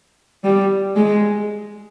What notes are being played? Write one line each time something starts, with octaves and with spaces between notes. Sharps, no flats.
G3
G#3